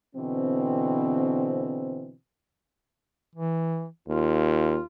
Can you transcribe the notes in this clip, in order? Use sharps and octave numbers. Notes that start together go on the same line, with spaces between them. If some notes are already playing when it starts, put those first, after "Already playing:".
B2 D3 E3 C4
E3
D#2 F4